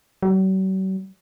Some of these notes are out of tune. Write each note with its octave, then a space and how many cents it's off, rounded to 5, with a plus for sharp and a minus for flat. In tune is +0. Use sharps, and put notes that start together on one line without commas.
F#3 +45